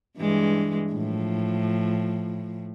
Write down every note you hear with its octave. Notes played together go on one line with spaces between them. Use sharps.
G2 E3 G#3
A2 F3